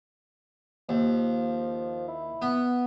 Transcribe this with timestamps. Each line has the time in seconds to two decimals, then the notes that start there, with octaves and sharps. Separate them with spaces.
0.89 D#2 F3
2.08 E4
2.42 B3